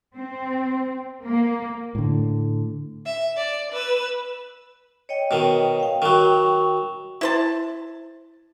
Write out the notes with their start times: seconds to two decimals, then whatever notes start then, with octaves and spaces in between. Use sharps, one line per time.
0.15 C4
1.24 A#3
1.95 A2 D3
3.06 E5
3.37 D5
3.72 B4 E6
5.09 C#5 D#5 G5
5.31 B2 D#3
5.80 F5 G5
6.02 D#3 F#3 F#4 G5 C#6
7.21 E4 C5 A5